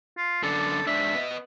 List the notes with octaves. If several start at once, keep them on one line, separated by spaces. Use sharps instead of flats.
F4
F#2 D3 A4
G#2 D4 E5
B3 D#5